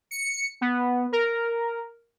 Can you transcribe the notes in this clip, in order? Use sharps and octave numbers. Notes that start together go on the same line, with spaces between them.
C#7
B3
A#4